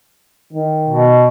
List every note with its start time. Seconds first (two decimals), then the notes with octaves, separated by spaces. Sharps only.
0.52 D#3
0.88 B2